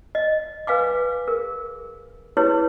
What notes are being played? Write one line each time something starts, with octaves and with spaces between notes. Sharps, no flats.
D#5
B4 F5 G#5 D6
G#4 A#4
E4 G4 G#4 B4 C#5